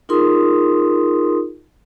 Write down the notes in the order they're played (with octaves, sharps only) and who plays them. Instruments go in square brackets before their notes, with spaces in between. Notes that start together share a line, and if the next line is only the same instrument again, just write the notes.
[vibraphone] D#4 F4 G#4 A#4 C6 D#6